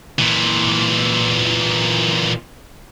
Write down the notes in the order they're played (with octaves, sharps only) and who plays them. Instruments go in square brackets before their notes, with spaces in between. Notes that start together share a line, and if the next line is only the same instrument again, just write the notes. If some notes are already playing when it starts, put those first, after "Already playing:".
[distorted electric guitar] A#2 E3